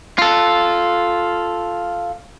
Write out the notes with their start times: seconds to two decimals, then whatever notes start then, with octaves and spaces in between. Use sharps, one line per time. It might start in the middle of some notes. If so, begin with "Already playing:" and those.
0.18 F4 A4